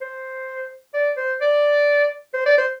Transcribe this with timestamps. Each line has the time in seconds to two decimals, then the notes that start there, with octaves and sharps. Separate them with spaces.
0.01 C5
0.94 D5
1.17 C5
1.41 D5
2.34 C5
2.46 D5
2.58 C5